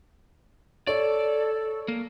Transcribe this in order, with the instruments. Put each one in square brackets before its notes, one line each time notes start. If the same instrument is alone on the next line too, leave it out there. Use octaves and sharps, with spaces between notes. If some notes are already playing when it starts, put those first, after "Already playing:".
[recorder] A4 [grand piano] C#5 [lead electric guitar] D5
[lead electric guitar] A#3